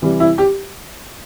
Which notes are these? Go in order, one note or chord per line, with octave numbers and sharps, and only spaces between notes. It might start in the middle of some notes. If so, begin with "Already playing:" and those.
C3 E3 G3
E4
G4